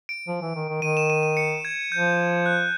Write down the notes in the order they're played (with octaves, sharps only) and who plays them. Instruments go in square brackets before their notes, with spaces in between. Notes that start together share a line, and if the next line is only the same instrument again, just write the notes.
[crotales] D7
[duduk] F3
E3
D#3
D#3
[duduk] D#3 [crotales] D#7
[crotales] E7
D#7
D#7
C#7
G#6
[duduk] F3 [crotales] G6
[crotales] F#6